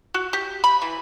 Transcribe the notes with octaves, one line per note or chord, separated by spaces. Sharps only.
F#4
G4
B5
E3